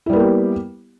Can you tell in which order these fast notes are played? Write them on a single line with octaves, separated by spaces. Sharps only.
E4 G3 B3 A#3 G4